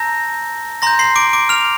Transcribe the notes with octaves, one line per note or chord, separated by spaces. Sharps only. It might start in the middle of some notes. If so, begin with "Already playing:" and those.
Already playing: A5 A#5 E6 G6 A#6
A#5 C6 G6 A#6
C6 C7
D6 D7
D6 D7
F6 F7